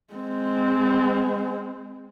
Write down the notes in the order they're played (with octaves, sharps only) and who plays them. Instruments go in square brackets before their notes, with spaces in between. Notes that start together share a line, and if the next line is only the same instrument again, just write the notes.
[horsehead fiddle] G#3 C4